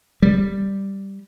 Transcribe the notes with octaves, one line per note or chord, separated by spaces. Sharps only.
G3